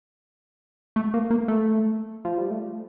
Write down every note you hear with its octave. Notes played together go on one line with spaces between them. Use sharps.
A3
A#3
A#3
A3
F3
G3
A3